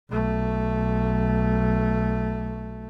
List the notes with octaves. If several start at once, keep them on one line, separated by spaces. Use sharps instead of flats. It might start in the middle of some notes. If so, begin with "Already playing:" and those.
B1 A3